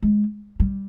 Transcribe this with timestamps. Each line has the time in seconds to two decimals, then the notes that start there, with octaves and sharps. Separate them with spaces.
0.02 G#3
0.60 G3